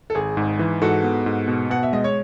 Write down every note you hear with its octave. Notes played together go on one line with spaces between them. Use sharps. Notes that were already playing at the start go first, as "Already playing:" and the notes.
A4
G#1 G#4
G#2
E3
G#2 F#4 A4
B3
G#2
B2
B2 F#5
E5
G#3 D#5
C#5